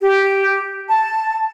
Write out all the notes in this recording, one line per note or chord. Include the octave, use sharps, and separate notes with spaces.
G4
A5